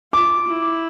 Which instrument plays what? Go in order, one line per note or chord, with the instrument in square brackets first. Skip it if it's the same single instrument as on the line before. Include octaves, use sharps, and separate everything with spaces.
[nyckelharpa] F4 [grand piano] D6
[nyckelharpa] E4